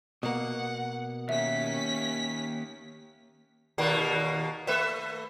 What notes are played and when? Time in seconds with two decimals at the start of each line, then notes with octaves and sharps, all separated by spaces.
0.23 B2 A#3 F#5
1.29 D#2 C#4 E5 B6
3.78 D#2 B2 A#3
4.67 A3 B4 E5